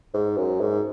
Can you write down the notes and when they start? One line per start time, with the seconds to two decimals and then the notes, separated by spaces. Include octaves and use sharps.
0.14 G#2
0.38 F#2
0.61 G#2